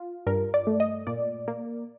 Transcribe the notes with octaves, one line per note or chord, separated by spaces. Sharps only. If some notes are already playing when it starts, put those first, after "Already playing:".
Already playing: F4
G2 A#4
D5
A3
D#5
A#2 D5
A#3